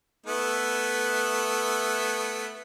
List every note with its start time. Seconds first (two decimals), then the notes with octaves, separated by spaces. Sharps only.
0.26 A3 B3 E4